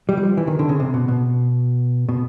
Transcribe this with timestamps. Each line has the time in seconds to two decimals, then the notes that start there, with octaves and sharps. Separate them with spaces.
0.09 G3
0.17 F#3
0.23 F3
0.37 E3
0.47 D#3
0.59 D3
0.69 C#3
0.80 C3
0.94 B2
1.08 B2
2.09 B2